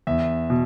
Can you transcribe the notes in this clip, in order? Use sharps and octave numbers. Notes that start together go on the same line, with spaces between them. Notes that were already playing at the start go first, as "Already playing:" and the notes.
E2 E5
B2